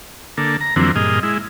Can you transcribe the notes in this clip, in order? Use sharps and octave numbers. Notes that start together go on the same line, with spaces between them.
D3 A#3 A4
A#5
F2 D3 E3 F#3 A#3 C4
G2 A#2 G#4 D#5 F6
G#3 E4